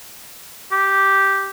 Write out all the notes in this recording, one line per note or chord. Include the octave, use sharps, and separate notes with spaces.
G4